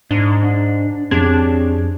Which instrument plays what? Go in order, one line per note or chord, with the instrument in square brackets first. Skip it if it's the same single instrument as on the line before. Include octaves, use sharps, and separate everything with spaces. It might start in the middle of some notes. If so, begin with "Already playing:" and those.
[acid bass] G#2 [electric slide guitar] D4
[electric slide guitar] D4
[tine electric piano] F2 G#4 G#6 [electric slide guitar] C4 G4 C#5 [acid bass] D4